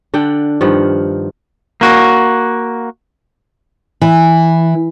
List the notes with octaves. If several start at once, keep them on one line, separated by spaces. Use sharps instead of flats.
D3 D4 F#5 G5
G2 D#3 F3 F#5
A#3 F#4
E3